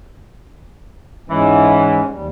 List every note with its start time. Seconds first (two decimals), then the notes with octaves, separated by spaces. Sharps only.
1.29 G#2 E3 G#3 C#4
2.08 D#2 G3